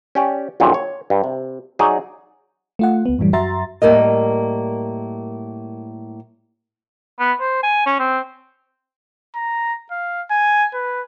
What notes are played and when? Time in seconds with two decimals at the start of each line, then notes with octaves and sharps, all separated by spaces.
0.15 C#4 G4 D5
0.60 A#1 F#2 A#2 D3 D#3
0.74 C#5
1.10 G2
1.24 C3
1.79 F#3 D#4 G#4 D5
2.79 A3 F4 F#5
3.06 C#2 B3
3.19 F#2 A2 E3 G3
3.33 F#2 F#4 E5 A#5 C6 A6
3.82 A2 G3 A#3 A#4 D#5
7.19 B3
7.40 C5
7.63 G#5
7.86 C#4
7.99 C4
9.36 A#5
9.91 F5
10.31 G#5
10.74 B4